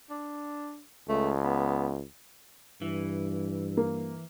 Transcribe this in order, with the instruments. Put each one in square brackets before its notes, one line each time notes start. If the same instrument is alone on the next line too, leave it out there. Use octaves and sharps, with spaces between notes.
[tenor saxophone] D4
[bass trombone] C#2 [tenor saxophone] A3
[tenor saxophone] B3
[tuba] G2 [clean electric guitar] E3
[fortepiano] A#3